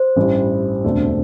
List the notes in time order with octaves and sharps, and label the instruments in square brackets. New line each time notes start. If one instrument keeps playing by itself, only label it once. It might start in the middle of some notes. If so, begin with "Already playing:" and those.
Already playing: [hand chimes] C5
[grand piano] A1 G2 G3 E4
E1 D2 C3 A3 D4